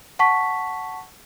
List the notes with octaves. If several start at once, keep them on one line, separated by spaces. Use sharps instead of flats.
F#5 A5 C#6 B6